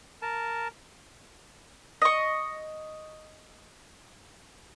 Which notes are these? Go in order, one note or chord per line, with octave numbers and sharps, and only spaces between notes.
A#4 A5
D#5 C#6